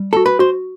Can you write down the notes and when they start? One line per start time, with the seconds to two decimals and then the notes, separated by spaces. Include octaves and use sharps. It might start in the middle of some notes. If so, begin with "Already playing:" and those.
Already playing: G3
0.13 F#4 A4
0.26 B4
0.39 F#4 C5